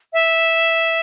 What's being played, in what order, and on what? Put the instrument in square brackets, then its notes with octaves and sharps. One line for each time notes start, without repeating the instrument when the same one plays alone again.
[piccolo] E5